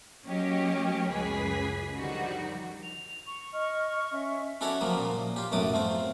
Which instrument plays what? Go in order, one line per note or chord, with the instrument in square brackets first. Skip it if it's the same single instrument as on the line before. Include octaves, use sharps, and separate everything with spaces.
[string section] F#3 A#3 C#4 G4 D#5
C#2 F#2 G#4 B4 B6
D3 D#3 F3 G3 D#4 F#4
[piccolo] F7
C#6
[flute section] D#5 F6 [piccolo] C#6
[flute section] C#4 E5
[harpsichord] C#4 E4 F#4 A4 C#5 D5
C#3 F3 F#3 A#3
A#2
F4 G4
B1 F#2 A2 F#3 D6 D#6
A3 C4 F4